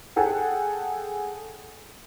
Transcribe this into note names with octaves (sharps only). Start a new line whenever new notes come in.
G#4 A4 F#5 G5